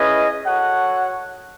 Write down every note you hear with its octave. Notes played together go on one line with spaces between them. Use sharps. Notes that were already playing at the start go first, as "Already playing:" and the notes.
Already playing: C#4 E4 G#4 B4 D#5
F#4 A4 C#5 F#5